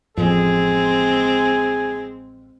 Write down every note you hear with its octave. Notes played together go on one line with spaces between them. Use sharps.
A1 F2 G#3 C4 G#4